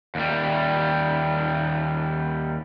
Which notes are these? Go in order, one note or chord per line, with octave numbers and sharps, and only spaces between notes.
D#2 G3